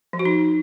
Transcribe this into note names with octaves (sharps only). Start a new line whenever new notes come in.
F3
F#4
D#4